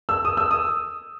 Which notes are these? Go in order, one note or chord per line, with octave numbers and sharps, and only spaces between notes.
E6
D#6
E6
D#6